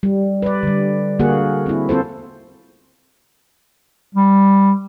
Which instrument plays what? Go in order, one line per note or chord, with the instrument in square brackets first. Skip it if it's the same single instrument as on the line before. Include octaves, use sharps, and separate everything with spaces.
[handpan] G3
B4 D5
D3 G3
D3 A#3 F#4 G#4 F#5
C4 E4
C4 F4 A4 C5
[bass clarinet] G3